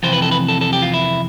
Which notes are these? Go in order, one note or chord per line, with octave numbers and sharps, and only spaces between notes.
F2 C3 E3 C5
B4
A4
B4
A4
A4
G4
F4
E4